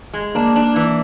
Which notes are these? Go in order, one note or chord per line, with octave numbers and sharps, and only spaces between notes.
G#3
A#3 D4
D4
E3